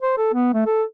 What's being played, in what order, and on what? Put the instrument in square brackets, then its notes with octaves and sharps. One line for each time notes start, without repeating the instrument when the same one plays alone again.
[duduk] C5
A4
B3
A3
A4